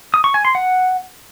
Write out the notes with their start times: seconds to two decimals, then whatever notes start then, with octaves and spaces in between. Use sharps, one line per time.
0.14 D#6
0.24 C#6
0.34 G#5
0.45 C6
0.55 F#5